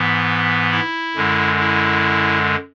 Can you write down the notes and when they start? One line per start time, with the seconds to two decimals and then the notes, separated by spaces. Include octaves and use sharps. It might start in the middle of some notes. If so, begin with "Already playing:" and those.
Already playing: G#2 E3 B3
0.71 E4
1.15 F#2 D3 G#3
1.59 E4